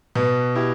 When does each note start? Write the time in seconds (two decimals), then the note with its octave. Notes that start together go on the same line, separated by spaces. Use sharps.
0.15 B2 B3
0.55 E4 G4